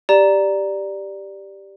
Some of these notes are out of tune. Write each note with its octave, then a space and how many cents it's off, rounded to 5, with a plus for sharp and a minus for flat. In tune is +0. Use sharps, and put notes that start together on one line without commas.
G4 +0 D5 +0 A#5 +0